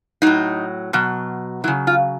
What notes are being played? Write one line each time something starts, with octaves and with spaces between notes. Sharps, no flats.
A2 F#3 D#4
B2 F#3
C#3 F#3 E4
F4